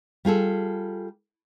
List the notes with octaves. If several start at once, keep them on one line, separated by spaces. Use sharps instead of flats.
G3 F4 G#4 A4